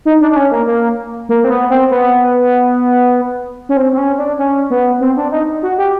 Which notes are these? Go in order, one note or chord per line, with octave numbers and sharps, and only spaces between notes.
D#4
D4
D4
C#4
A#3
A#3
A#3
C4
B3
C4
B3
C#4
C4
C4
C#4
D4
C#4
B3
C4
D4
D#4
F#4
G4